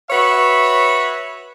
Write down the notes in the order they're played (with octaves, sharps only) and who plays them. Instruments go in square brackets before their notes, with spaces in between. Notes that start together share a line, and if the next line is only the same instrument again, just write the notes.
[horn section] F#4 B4 C#5 E5